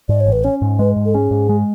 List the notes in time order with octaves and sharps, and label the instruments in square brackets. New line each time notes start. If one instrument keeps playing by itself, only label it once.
[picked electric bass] G#2 [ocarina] D5
[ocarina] C#5
[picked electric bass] A1
[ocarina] B4
[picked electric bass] C#4 [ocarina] C#5
[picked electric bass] G#2
[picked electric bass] G#3 [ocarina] B4
[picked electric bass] G#2
[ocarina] A4
[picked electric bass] C#4 [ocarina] G#4
[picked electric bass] G#2
G#3